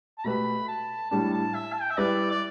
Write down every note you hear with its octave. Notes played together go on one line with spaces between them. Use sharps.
A5
B2 A3 G4 B4 B5
A5
A2 G3 D4 A5
A5
E5
A5
G5
E5
G3 E4 B4 D5
D5